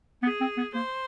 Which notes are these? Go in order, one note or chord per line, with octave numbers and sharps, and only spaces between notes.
B3 G#4
C4
B3
A#3 C5